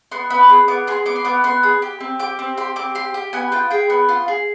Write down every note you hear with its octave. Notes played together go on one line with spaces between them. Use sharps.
B3 C6
B3 B5
G#4
B3 D6
G#4 C6
B3 D6
C6
B3 D6
B3 C6
G#4
G4
C4
G4 D6
C4
G4 C6
C4 D6
G4 C6
G4
B3 G#5
F4 G5
G#4 G5
B3
F4
G#4